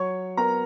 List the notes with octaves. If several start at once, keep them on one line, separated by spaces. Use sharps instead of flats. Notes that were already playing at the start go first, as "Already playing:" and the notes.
Already playing: F#3 C#5 C#6
B3 A#4 A#5